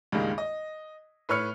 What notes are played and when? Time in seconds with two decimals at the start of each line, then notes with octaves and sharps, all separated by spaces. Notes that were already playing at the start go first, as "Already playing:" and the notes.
0.12 C#2 G2 D#3 G3 G#3 A#3
0.38 D#5
1.29 A2 B4 C#5 F6 C#7